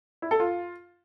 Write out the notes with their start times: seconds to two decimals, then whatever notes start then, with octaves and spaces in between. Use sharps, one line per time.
0.22 E4
0.31 A4
0.40 F4